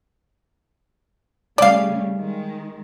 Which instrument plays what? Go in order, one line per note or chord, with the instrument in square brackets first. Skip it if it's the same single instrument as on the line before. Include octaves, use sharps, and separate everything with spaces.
[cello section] C#3 G3 A3 [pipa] D5 F5
[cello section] D#3 G#3